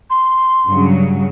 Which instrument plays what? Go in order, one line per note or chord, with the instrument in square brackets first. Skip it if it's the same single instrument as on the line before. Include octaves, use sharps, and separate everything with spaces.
[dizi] C6
[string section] G2 C#3 F#3